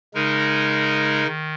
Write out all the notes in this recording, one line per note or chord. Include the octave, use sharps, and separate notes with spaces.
C#3 G#3 D#4 A#4
D#3